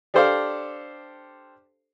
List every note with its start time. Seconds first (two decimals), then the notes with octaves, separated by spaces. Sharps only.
0.14 D4 G4 A4 C5 D5 F5